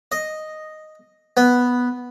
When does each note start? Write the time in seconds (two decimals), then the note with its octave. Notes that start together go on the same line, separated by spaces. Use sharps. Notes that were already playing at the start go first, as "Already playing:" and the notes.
0.12 D#5
1.37 B3